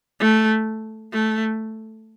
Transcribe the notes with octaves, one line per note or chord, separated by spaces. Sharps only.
A3
A3